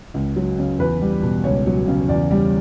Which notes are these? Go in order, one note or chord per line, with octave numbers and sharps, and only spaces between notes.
C#2
F#3
C#3
E2 B4
G3
B2
C#2 C#5
F#3
C#3
E2 D5
G3